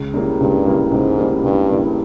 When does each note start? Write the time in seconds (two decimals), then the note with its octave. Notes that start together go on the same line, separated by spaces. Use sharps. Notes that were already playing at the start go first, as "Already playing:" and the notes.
Already playing: C#2
0.14 C#3 G3 A#3 E4
0.40 C#2 G2
0.66 C#3 G3 A#3 E4
0.91 C#2 G#2
1.18 C#3 G3 A#3 E4
1.43 C#2 G2
1.70 C#3 G3 A#3 E4